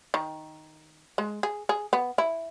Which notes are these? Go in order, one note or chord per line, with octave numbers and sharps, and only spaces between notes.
D#3
G#3
G#4
G#4
B3
E4